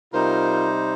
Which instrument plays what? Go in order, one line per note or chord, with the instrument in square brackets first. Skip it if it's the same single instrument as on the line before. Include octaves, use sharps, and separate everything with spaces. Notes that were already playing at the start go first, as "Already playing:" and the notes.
[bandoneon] C3 G3 D#4 C5 [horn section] F4 A#4